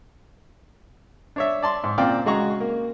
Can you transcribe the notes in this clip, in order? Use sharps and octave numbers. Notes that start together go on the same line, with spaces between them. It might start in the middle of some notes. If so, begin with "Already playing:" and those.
D4 C#5 E5
D5 A5 C6
G#2
A#2 C#3 C4 D5 F5 G5
C#3 G#3 F#4 A#5 C#6
A#3